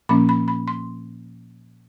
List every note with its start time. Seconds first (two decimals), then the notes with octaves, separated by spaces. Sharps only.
0.09 A#2 F3 A#3 C#4 B5
0.29 B5
0.48 B5
0.68 C6